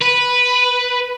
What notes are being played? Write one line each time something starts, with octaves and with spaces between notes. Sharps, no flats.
B4